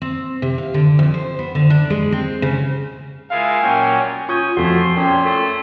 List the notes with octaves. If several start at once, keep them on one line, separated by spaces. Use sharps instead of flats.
C4
C3
F5
D3
F2
C5
B3
D3
D4
G#3
C4
C#3
G#3 E4 F4 A#4 F5 G#5
A#2 F#3 C#4 G5
C#4 F4 G#5 C#6 D#6 G6
F2 F3 A3 F#4 C6
A#2 C#4 G5
A3